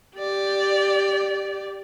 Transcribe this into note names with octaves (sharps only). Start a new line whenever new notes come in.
G4 D5